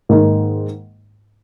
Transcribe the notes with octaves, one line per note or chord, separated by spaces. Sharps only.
G#2 D#3 A#3 D#4